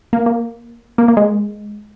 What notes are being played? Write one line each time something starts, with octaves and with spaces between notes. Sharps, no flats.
A#3
A#3
A#3
A#3
G#3